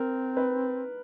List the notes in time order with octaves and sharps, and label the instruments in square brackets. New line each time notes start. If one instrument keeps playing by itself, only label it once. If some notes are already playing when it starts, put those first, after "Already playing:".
Already playing: [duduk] C4 [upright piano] A#4
[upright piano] B4